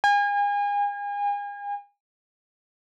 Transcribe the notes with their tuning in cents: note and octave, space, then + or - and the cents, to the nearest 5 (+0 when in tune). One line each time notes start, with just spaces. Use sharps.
G#5 -35